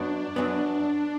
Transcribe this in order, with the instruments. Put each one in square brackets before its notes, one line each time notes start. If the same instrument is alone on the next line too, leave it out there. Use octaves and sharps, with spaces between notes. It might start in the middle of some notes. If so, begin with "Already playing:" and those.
Already playing: [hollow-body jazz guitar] F#2 F#3 B3 [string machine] D4
[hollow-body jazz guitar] F#2 F#3 B3